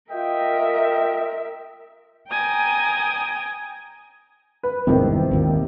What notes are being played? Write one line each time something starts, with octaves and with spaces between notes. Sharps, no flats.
F4 A#4 D#5 E5 G5
G5 G#5 A#5 D#6
B4
G#1 E2 G2 C3 D#3
G#1 D#2 A#2